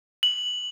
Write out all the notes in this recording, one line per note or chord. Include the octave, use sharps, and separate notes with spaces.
F#7